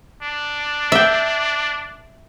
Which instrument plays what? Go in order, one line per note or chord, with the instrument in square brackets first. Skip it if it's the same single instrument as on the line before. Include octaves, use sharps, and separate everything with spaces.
[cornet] D4
[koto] E5 G5